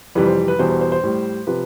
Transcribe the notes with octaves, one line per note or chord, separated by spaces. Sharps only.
F2 C3 E3 G3 B4
C5
B4
E2 B2 G3 C5
C5
C5
C5
A2 G3
C3 F3 B4